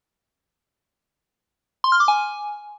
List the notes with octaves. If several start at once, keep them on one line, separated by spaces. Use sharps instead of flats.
C6
F6
D6
G#5